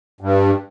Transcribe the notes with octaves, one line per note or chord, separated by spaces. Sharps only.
G2